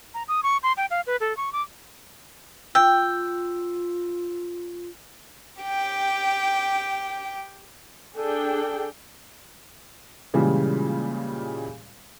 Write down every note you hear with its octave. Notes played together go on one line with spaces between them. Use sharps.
A#5
D#6
C#6
C6
G5
F5
B4
A4
C#6
D6
F4 G5 E6
G4 G5
D4 G#4 A4 G5
A#2 C#3 E3 G3 G#3